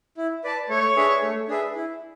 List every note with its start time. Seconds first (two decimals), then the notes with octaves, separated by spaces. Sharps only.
0.17 E4
0.44 B4 D5 A5
0.69 A3 C#5
0.96 D4 G#4 B4 E5
1.22 A3
1.48 D4 G#4 B4 E5
1.75 E4